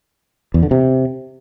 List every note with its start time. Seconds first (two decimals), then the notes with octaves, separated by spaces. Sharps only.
0.54 E2
0.63 D3
0.71 C3